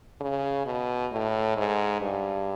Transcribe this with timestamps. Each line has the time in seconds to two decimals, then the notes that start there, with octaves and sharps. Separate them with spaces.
0.21 C#3
0.66 B2
1.12 A2
1.57 G#2
2.01 G2